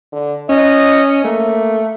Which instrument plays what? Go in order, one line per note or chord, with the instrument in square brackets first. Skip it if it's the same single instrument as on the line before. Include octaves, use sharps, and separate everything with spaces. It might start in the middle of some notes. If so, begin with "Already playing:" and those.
[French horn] D3
[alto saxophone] C#4 [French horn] D#5
[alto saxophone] A3 [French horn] A#3